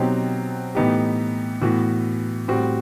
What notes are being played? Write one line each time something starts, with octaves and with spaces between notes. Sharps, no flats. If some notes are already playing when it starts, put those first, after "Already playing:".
Already playing: B2 F#3 C4 D#4 G4
A2 E3 B3 D#4 G4
A2 E3 B3 F#4
A2 G3 C4 F#4